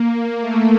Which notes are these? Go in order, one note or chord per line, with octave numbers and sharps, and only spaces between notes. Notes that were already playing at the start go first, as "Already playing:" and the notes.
Already playing: A#3
A3